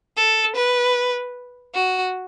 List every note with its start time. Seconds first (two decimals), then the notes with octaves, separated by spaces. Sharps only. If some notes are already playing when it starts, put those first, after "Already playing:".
0.17 A4
0.57 B4
1.74 F#4